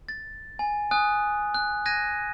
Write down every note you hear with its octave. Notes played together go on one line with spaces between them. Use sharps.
A6
G#5
G#5 D#6 F#6
F#6
F#6 G#6 A#6 D#7